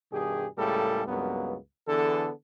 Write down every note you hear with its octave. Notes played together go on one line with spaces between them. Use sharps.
G2 B2 D#3 G4 G#4
C#2 A2 G3 A#3 G#4 A4
C#2 G2 F#3 A#3 B3
D3 E3 B3 G#4 A4